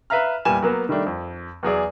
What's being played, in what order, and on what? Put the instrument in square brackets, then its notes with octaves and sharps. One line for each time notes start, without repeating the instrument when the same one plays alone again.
[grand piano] B4 E5 F5 A#5 F6
E2 A#2 G3 G#5 E7
F#3 A#3 B3
D#3 G3 A3 D4
F2
E2 F#3 G#4 D5